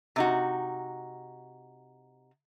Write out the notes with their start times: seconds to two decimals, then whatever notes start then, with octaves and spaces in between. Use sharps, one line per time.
0.16 C3 D#4 F#4